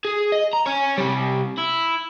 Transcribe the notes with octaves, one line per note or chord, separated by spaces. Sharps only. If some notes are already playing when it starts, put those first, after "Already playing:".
G#4
D#5
A#5
C#5 G#5
C3 G3
E4